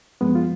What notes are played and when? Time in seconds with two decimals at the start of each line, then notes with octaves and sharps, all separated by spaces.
0.21 F#2 F3 G#3 B3
0.35 F4